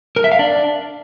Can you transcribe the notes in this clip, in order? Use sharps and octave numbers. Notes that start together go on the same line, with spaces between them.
A#4
E5
F5
D4